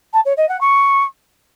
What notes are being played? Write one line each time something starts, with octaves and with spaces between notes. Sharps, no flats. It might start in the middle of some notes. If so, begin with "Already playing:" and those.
A5
C#5
D#5
F#5
C#6